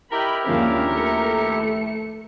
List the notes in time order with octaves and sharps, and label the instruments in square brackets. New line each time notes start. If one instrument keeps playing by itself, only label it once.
[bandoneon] E4 G4 [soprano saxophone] A#4 [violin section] D#5 G5 B5
[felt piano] D#2 F3 G#3 [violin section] C#4 D4 F5
[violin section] A3 C#7